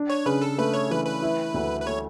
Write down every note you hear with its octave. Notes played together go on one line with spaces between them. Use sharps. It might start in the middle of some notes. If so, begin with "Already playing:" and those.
Already playing: D4
C#5
C#3 B4
A4
A3 B4
C#5
E3 B4
B4
E4
D2
B4
A3 C#5